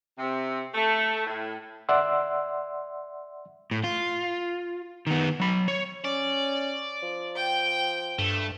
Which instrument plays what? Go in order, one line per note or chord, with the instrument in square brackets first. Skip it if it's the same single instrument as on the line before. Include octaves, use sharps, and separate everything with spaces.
[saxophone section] C3
A3
A2
[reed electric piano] D5 E5 F#5 C6 E6
[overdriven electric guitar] A2
F4
D#3 B3
F#3 B5
C#5
[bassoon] C#4 [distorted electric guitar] D5
[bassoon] F3
[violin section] G5
[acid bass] G2 [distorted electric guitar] A3